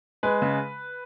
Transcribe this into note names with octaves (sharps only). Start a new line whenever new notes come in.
G#3 B4
C#3